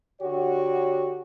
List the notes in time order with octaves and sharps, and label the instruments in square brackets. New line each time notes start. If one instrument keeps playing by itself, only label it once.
[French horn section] D3 F#4 G4 C#5